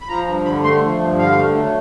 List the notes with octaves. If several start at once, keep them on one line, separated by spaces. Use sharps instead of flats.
B5
F3 A#5
G2
D3 B5
A3 C6
F3
G2
D3 F5
A3
F#3